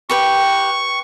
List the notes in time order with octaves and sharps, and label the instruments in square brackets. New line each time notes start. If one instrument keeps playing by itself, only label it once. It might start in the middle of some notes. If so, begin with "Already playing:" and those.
[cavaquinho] G4 B4 G5 [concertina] C#6